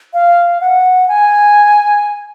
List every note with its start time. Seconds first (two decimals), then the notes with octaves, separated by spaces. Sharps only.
0.14 F5
0.61 F#5
1.08 G#5